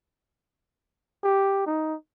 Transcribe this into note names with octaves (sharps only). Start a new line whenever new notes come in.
G4
D#4